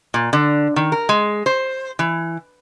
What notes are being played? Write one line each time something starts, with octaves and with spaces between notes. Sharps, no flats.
A#2
D3
D#3
A#4
G#3
C5
E3